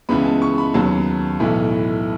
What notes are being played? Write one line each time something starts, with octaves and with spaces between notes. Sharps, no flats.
C#2 C#3 E3 G#3 B3 B5
A5
C#6
B5
D#2 C#3 F#3 B3 A5
B1 A2 E3 B3